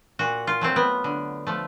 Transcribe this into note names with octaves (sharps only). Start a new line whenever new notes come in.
A#2 F#4
F4
F#3 A3 C4
B3
D3
F3 A3